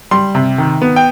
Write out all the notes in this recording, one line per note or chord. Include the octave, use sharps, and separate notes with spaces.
G3 C6
C3
D#3
B3
G5